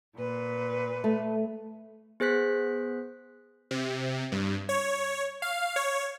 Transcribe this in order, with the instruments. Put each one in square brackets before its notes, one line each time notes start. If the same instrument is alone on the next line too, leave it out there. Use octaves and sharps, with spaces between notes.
[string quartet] A#2 B4
[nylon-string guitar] A3
[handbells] B3 G#4 C5 F#6 B6
[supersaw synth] C3
G2
C#5
F5
C#5